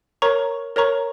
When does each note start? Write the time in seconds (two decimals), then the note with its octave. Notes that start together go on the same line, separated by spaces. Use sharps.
0.22 A#4 C#5 A#5 C#6
0.76 A#4 C#5 A#5 C#6